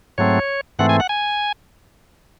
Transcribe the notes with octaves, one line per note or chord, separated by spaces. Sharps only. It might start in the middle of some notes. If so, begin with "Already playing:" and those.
G#2 F#3 A3 C4 C#5
G#2 E3 A3 C4 F#5
G#5
F#5
G#5